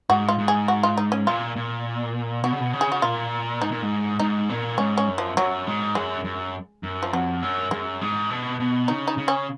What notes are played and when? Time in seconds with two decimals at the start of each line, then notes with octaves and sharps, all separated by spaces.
0.10 G#2 F#4
0.29 F4
0.38 G#2
0.48 G#4
0.68 F#4
0.83 F4
0.98 D#4
1.12 C#4
1.27 A#2 F4
1.56 A#2
2.44 B2 F#4
2.52 C#3
2.60 B2
2.73 C#3
2.81 G#4
2.92 F#4
3.02 A#2 F4
3.61 G#2 D#4
3.71 A#2
3.82 G#2
4.20 G#2 D#4
4.49 A#2
4.78 G#2 C#4
4.98 C#4
5.08 F#2
5.18 F3
5.37 F#2 F#3
5.67 G#2
5.95 F#2 G#3
6.24 F#2
6.83 F#2
7.03 F3
7.12 F2 F#3
7.42 F#2
7.71 F#2 G#3
8.01 G#2
8.30 B2
8.60 B2
8.88 C#3 D#4
9.08 D#4
9.18 C#3
9.28 C#4